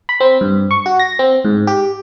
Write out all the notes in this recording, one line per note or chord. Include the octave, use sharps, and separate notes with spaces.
B5
C4
G2
C#6
F#4
A#6
C4
G#2
G4